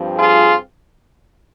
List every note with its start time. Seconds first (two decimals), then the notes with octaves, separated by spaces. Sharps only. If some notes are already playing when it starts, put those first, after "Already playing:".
Already playing: G2 F3 C4
0.17 F4 G#4